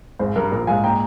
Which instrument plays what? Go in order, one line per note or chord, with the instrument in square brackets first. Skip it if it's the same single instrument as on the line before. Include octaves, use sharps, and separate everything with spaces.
[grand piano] G#1 [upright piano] G#4 C5
[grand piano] G2 [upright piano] A#4
[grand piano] A#1 [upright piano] A#4
[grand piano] G#2 [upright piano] F5 G#5
[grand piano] A#2 [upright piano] G5 A#5